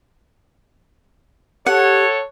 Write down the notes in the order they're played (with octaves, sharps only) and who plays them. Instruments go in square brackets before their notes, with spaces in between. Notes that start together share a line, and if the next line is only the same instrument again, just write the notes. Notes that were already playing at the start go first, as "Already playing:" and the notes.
[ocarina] G4 [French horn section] A4 C#5 [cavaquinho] F#5